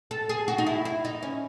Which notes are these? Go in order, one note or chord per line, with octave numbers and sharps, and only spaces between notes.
A4
G#4
F#4
D#4
E4
E4
D#4
C#4